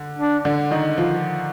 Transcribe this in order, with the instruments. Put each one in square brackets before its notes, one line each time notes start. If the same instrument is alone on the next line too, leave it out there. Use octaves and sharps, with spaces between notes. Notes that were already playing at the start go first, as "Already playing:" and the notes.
Already playing: [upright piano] D3
[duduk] D4
[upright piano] D3 D4
D#3 D#4
F3 F4